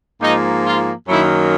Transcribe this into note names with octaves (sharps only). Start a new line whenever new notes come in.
G#2 F3 A#3 D#4
F4
F#2 D#3 F#3 A#3 E4